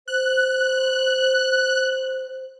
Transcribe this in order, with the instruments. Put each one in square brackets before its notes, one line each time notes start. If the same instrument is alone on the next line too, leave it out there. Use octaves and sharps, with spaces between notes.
[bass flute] C5 [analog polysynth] F#6